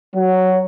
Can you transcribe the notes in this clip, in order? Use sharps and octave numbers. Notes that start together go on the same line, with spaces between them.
F#3